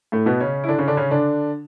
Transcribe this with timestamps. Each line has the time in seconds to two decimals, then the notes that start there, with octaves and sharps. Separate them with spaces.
0.12 A2 A3
0.26 B2 B3
0.40 C#3 C#4
0.64 E4
0.68 D3 D4
0.79 C#3 C#4
0.88 D3 D4
0.97 C#3 C#4
1.11 D3 D4